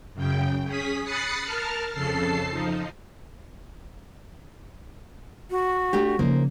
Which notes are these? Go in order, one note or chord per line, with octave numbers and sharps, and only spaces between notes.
F#2 C#3 G5
C#4 G#4 D#6 B6
B5 D#6 F#6 A6 C7 C#7
A#4 A5 F6
F2 C#3 A4 A5 C7
F3 D#4
F#4
A3 D4 G4
C#3 F3 A#3 D#4 C5